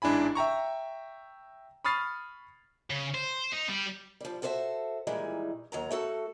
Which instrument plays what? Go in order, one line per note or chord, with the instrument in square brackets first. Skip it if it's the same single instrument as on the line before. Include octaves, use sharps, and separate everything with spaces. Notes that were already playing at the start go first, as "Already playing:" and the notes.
[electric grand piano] A1 G#2 D4 E4 G#5 B5
E5 G5 A#5 C#6
B5 C#6 D#6 F6 A6 C7
[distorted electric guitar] C#3
C5
D#4
G3
[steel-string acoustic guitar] F3 G3
F#4 A4 C5 D5 E5
A#2 D#3 E3 G3 G#3
D#2 F#3 A#5
A3 F#4 A4